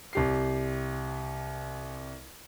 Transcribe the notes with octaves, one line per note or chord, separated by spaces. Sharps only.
C2 G4 C7